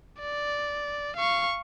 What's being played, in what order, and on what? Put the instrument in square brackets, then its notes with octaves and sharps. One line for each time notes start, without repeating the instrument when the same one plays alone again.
[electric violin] D5
F5 C#6